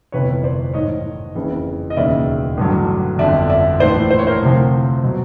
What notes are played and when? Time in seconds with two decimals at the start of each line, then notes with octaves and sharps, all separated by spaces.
0.12 G1 F2 C3 E3 B4 C#5
0.44 C5 D5
0.74 A1 G#2 D#3 C#5 D#5
1.35 F#1 F2 C#3 E3
1.90 D#5
1.97 E1 D#2 C#3 E3 D5 E5
2.57 A1 G2 D3 F#3
3.19 G1 F2 D3 D5 E5
3.50 D5 E5
3.79 A#1 A2 E3 C5 D5
4.11 C5
4.19 C#5
4.27 A#4 C5
4.41 D2 C3 F3
5.03 B2 F#3